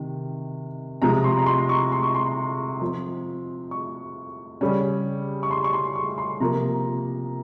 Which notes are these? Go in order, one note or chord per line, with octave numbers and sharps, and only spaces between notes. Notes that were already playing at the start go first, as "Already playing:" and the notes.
Already playing: C3 D#3
C3 F3 G#3 A#5
C6
A#5
C6
C#6
C6
C#6
C6
F3 C4
C#6
C#3 G3 C#4
C#6
C6
C#6
C6
C#6
C6
C3 F3 A#3 A#5